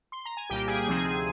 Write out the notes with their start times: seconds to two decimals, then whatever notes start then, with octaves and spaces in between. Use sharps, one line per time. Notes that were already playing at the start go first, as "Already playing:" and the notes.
0.12 C6
0.25 A#5
0.37 G#5
0.50 C2 A#2 G3 A#3 G4 G5
0.68 G#4 G#5
0.86 D2 C3 F3 C4 D#4 G#4 G#5